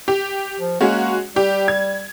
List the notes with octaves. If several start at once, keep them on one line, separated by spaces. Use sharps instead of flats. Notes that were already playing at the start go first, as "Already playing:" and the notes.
G4
F3
G#3 A#3 C#4 F#4
G3 G4
G#6